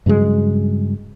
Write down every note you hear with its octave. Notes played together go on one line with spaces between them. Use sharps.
G2 C#3 F#3 G#3